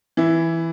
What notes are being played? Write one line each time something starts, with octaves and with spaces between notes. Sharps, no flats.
E3 E4